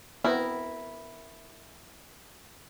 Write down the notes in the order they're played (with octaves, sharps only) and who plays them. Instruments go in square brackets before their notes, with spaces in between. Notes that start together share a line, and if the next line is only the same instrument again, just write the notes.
[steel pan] B3 C4 [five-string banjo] E4 A#4